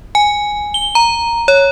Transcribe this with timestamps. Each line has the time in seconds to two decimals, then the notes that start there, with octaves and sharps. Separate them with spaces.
0.15 G#5
0.74 G7
0.95 A#5
1.48 C#5